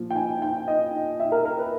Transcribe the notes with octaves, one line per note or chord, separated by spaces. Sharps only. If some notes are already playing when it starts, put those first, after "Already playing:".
Already playing: A#2 F3
G5
G#5
G5
D#5
E5
A#4
A#4
B4